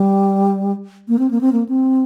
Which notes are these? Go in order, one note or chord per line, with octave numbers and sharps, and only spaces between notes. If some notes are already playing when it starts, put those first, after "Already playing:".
Already playing: G3
A#3
C4
A#3
C4
A#3
C4